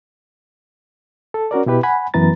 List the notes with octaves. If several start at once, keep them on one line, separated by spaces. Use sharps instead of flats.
A4
C#4 F#4 A#4 D5
B2 E4 G4 B4
F#5 G#5 B5
F#2 E3 B3 B4 A#5 A6